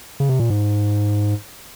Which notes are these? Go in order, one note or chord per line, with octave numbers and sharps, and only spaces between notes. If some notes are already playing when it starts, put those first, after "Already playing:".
C#3
C3
A#2
G#2